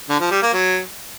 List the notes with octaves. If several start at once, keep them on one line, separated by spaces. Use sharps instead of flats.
D3
F3
G3
A#3
F#3